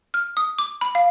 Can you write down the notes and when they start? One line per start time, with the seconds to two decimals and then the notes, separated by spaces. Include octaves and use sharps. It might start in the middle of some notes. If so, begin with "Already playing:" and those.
0.14 F6
0.37 D#6
0.59 D6
0.81 B5
0.95 F5